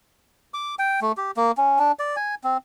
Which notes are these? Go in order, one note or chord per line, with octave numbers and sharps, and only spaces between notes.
D6
G5
A3
G4
A#3
C#4
D4
D5
G#5
C4